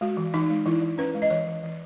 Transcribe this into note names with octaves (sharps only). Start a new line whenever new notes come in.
G#3 F#4
E3
E3 D#4
G#3
E3 E4
E3
C#4 B4
G#3
D#5
E3 C#5
E3
E3